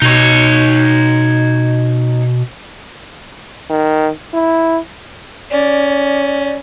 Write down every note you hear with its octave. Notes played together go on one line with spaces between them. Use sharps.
B2 D#4 C#5
D#3
E4
C#4 D5